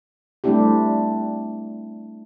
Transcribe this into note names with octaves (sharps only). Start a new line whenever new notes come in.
G3 A3 C4 D4 E4 G4